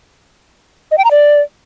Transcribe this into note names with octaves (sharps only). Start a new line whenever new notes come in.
D#5
G5
A#5
D5